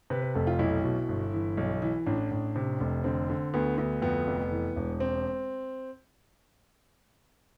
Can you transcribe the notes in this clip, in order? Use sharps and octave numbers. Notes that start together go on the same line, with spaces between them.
C3 B4
B4
F1 A4
F4
B1 E4
B2
G1
E3
B1
E3
A1 D4
A1
C3
F1
D3 C4
D3
D2 B3
D2 B3
F2 B3
F1
E3
E1
C4